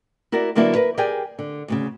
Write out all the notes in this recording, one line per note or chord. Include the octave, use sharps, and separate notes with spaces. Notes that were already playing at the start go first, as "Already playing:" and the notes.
E4 F#4 A#4 D5
D3 F#3 A#3 B3 D4 E4
A#4 B4
G4 G#4 A#4 D5 G5 G#5
D3
D2 A#2 C#3